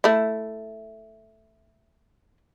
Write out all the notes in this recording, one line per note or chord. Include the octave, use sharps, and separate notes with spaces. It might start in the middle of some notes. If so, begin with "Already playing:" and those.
A3 E4